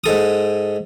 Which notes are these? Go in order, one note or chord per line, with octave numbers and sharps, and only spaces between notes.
G#2 A4 D#6